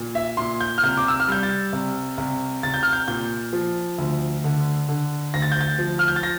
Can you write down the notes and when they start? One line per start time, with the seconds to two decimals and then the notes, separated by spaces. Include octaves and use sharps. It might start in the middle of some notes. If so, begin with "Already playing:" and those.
Already playing: A#2
0.15 E5
0.37 A#2 C6
0.61 G6
0.78 F6
0.83 C2 G6
0.97 D6
1.08 E6
1.20 F6
1.28 G3 G6
1.43 A6
1.73 C2
2.18 C2
2.63 C2 A6
2.74 G6
2.83 F6
2.93 G6
3.08 A#2 G6
3.53 F3
3.98 D2
4.44 D3
4.89 D3
5.34 D2 A#6
5.42 A6
5.52 G6
5.61 A6
5.79 F3
5.99 F6
6.08 G6
6.16 A6
6.23 A#6